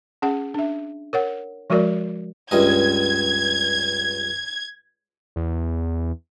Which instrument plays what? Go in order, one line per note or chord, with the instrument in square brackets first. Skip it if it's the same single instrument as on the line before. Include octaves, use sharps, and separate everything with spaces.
[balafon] C#4 G#4 F#5
D4 E5
A#4 C#5 F#5
F3 G#3 F#4 A#4 D5
[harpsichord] C#2 G2 D#5 [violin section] G#6
[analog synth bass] E2